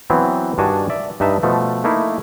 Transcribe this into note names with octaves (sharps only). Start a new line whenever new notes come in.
E3 F#3 B3 C4
G2 D#3 D4 F#4 G#5 A5
D5 E5
G2 D#4 B4 E5 A5
B2 F3 A3
A3 A#3 D#4 E4